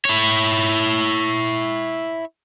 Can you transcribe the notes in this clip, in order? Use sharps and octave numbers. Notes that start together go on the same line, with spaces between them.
E4 C#5